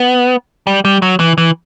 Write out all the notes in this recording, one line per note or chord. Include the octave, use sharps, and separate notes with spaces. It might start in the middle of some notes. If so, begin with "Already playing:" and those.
Already playing: B3
G3
G3
F#3
E3
E3